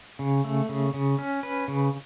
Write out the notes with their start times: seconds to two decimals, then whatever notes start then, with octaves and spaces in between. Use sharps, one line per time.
0.19 C#3
0.44 A3
0.69 C#3
0.94 C#3
1.19 C#4
1.43 B4
1.68 C#3